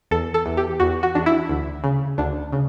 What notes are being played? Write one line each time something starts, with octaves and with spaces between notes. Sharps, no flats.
E2 A4
A4
E2
G4
E2 F#4
F#4
E2 D4
E4
D2
C#3
D2 D4
C#3